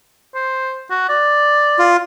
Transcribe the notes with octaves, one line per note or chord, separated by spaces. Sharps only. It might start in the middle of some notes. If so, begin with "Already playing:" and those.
C5
F#4
D5
F4